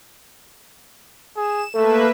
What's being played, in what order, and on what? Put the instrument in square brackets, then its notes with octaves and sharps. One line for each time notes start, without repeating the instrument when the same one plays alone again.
[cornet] G#4 [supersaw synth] E7
[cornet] A3 [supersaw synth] A#3 B4 E5 [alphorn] A4